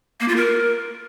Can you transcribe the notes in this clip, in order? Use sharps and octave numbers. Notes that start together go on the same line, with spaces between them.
A#3
F4
A#4